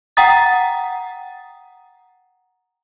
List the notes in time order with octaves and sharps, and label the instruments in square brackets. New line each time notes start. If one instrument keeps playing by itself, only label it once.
[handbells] F#5 G5 A#5 D#6 A6